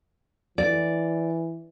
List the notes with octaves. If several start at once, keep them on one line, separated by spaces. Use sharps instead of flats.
E3 D5